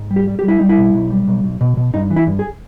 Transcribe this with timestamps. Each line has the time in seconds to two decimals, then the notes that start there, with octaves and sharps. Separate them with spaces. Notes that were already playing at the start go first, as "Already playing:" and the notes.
Already playing: G#2
0.11 G3
0.16 G4
0.27 G3
0.39 G4
0.43 G3 E4
0.59 G3 D#4
0.69 E4
0.78 B2
0.94 B1
1.10 G3
1.27 B1
1.44 B1
1.61 B2
1.77 B2
1.94 G2 D#4
2.10 E3
2.16 E4
2.27 G2
2.39 G#4